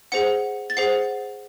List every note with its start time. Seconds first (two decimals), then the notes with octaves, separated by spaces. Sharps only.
0.12 G#4 C5 F#5 C#7
0.70 A6
0.77 G#4 C5 F#5 C7